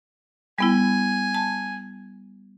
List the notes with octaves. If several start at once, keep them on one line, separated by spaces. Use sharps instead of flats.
G3 B3 E4 G#5
A5